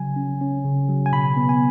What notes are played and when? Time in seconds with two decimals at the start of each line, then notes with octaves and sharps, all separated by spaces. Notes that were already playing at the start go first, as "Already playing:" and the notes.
Already playing: C#3 F#3 G#5
0.16 C#4
0.41 C#4
0.65 C#3
0.89 F#3
1.06 G#5
1.12 B2 B5
1.37 B3
1.49 G#5